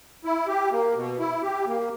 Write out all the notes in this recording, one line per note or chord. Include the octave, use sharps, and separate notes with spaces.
E4
G4
A#3
B2
E4
G4
A#3